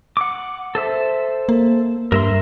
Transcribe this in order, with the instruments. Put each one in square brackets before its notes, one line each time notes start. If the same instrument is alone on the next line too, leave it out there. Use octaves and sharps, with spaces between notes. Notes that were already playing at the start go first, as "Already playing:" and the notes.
[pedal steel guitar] F#5 D6
A4 C5 E5
[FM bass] A#3
[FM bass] G2 [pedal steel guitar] A#4 E5 C6